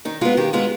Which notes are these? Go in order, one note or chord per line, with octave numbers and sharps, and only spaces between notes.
D#3 D#4
G#3 B3 F4
D#3 G4
G#3 B3 F4